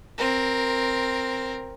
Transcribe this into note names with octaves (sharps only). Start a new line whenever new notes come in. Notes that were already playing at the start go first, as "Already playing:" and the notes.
C4 A#4